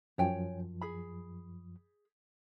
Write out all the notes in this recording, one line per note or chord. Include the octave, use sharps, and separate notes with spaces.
F#2 F3 C#5 G5 G#5
G#4 B5